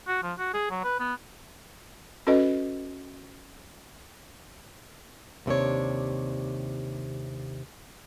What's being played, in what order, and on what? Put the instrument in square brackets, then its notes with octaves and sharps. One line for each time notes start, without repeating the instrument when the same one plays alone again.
[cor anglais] F#4
F3
F#4
G#4
F#3
B4
B3
[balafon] C#4 F#4 A4 B4 D#5
[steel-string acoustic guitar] D#2 C3 D4 C#5